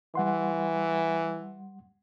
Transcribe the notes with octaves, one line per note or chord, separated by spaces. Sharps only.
E3 G3 F#5 C6